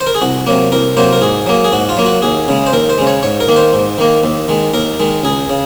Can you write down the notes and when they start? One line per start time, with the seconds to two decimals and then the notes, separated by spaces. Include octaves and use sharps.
0.01 C5
0.07 A#4
0.15 G#4
0.21 C2 F#4
0.47 C3 F#3 A#3
0.72 C2 A#4
0.97 C3 F#3 A#3 C5
1.13 A#4
1.21 G#2 G#4
1.46 F#3 A#3
1.64 G#4
1.72 G#2 F#4
1.89 F4
1.97 F#3 A#3
2.06 F#4
2.22 D#2 G#4
2.48 C#3 G#3
2.66 C5
2.72 D#2 A#4
2.90 C5
2.98 C#3 G#3
3.07 C#5
3.23 G#2 C#5
3.40 A#4
3.48 D#3 A#3
3.56 C5
3.73 G#2
3.98 D#3 A#3
4.24 D#2
4.48 D#3 G#3
4.74 D#2 A#4
5.00 D#3 G#3
5.24 C#2 G#4
5.49 C#3